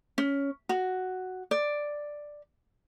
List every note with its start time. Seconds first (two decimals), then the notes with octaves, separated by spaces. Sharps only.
0.18 C#4
0.69 F#4
1.51 D5